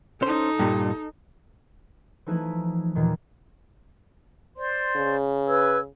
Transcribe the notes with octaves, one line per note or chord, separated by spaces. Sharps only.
C#4 D#4 A4 C5
G2 A#2
E3 F3 A3 D#4 E4 B4
D#2 A#2 D#3 E3
C5 D5 C6
C#3
B4 E6 G#6